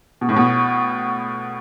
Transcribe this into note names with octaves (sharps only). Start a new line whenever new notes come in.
B2
A2
B2